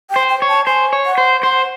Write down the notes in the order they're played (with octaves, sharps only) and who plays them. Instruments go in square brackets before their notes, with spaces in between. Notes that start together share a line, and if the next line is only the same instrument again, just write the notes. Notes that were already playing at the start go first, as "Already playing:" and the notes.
[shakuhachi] G5
[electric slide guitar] C5
[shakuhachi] G5
[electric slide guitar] C#5
[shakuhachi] A5
[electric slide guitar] C5 [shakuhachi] G#5
[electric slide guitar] C#5
[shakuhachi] F#5
[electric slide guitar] C5
[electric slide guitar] C5 [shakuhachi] F#5